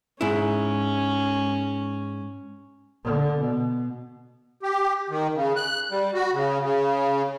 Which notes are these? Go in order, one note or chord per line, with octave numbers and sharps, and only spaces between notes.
G#2 C#4 E4
D3
B2
G4
D#3
C#3
F#6
G3
F#4
C#3
C#3